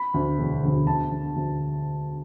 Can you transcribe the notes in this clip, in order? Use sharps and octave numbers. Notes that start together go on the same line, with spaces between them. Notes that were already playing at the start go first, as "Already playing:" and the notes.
Already playing: B5
D2 D3
E1
D2 D3
D2 A5
D3
D2